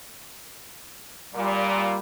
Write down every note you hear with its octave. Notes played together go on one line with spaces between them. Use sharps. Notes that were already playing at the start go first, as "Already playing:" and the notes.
A#2 G3